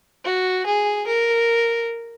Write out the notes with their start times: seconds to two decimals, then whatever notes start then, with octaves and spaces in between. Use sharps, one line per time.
0.25 F#4
0.66 G#4
1.07 A#4